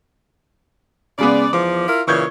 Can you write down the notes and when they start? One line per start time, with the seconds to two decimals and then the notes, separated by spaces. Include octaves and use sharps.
1.18 C#3 G#3 B3 D5
1.53 E2 F3 D6
1.87 E4 F4 A#4
2.08 A#2 C#3 E3 C#6 G6 G#6